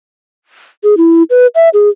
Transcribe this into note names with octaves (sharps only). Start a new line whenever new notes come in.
G#4
E4
B4
E5
G#4